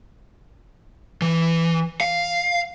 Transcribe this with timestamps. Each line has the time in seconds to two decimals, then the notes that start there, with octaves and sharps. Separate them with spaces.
1.22 E3
2.01 F5